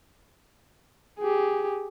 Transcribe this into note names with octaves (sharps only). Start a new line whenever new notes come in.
G4 G#4